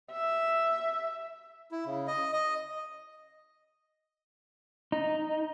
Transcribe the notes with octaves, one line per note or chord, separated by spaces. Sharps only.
E5
E4
C#3
D#5
D#5
D#4